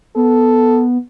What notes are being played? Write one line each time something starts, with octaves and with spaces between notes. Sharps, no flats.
B3 A4